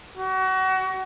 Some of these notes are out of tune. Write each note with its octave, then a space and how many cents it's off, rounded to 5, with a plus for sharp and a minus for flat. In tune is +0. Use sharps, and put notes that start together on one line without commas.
F#4 +30